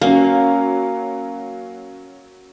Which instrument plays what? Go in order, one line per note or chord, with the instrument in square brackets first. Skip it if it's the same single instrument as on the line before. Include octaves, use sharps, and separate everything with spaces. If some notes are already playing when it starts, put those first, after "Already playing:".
[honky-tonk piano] F#3 C#4 [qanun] A#3 [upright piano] F5